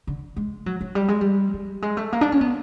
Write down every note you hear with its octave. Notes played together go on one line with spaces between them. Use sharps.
D3
G#3
F#3
F#3
G3
G#3
G3
G3
G#3
A3
A#3
D4
C#4
B3